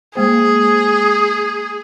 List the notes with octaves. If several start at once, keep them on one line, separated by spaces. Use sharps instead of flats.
G#3 A#3 G#4 C5